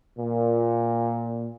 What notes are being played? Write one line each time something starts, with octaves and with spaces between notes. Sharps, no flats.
A#2